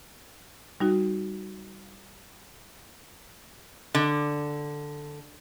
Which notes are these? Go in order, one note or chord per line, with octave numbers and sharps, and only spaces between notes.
G3 D#4 F#4
D3